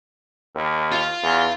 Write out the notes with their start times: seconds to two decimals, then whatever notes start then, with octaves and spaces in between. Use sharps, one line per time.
0.55 D#2
0.92 F4 F5
1.23 E2